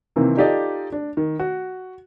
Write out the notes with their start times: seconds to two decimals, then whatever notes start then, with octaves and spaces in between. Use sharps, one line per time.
0.16 C3 D#3 E3 A#3 C4
0.37 D#4 F4 G4 A4 D5 D#5
0.92 D4
1.17 D#3
1.40 F#4